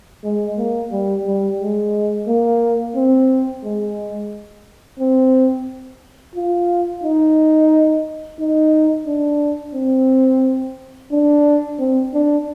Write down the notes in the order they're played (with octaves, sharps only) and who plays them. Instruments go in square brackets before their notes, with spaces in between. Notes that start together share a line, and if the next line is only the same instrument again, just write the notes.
[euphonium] G#3
A#3
G3
G3
G#3
A#3
C4
G#3
C4
F4
D#4
D#4
D4
C4
D4
C4
D4